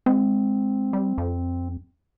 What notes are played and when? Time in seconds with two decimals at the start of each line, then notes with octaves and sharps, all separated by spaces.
0.06 G#3 C4
0.93 G3
1.18 F2